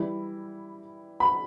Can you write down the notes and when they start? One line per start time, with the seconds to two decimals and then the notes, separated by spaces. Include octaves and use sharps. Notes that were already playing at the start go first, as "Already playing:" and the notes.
Already playing: E3 G3 E4
1.20 B5